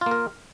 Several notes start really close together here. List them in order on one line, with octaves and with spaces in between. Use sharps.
F4 A#3 A#4